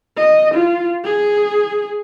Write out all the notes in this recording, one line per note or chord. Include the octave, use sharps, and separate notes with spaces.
D#5
F4
G#4